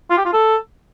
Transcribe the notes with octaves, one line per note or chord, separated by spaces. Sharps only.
F4
G4
F4
A4